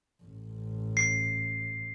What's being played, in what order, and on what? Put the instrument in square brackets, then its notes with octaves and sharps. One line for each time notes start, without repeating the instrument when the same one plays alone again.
[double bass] A1
[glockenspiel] C7